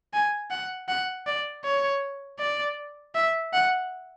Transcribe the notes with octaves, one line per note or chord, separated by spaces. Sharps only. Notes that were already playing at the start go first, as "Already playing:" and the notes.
G#5
F#5
F#5
D5
C#5
D5
E5
F#5